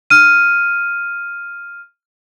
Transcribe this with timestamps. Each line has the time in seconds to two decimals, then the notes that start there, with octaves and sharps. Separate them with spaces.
0.10 F6 D#7